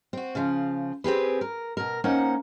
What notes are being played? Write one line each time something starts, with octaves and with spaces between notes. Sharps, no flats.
C4 F#4
C#3 F3 F4
C4 G4 G#4 B4
A#4
B2 A#4
A#3 C#4 D#4 C5 F#5